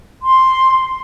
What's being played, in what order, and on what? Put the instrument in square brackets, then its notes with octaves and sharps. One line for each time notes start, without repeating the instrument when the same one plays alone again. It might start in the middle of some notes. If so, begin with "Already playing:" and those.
[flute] C6